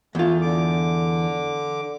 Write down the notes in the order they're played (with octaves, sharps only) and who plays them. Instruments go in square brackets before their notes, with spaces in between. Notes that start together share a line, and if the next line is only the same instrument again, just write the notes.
[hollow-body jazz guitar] E2 F4 [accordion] A3
[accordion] D3 D6